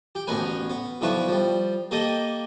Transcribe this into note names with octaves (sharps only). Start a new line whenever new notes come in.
G4
A1 D2 B3 A#4 B4 G#5
B3
B1 D3 F3 E4 B4 C#6
F3 G3
A#3 G4 A4 D#5 D#6